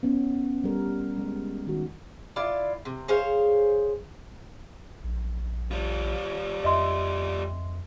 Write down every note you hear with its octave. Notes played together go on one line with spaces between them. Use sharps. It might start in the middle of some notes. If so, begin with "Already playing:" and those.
B3 C#4
G3 A#4
G#3
D#3 F#4
E4 F4 D5
C3
G#4 C5 C#5 F5
A#1
G3 F4
F2 D#5 E5 C6